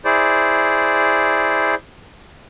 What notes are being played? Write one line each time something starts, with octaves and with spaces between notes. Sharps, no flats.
E4 G#4 C5 D5